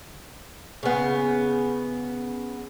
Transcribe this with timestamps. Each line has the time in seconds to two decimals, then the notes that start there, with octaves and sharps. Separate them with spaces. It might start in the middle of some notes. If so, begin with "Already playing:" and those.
0.83 C#3 B3